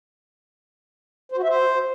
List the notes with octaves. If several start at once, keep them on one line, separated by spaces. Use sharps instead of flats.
C5
F#4
E5
C5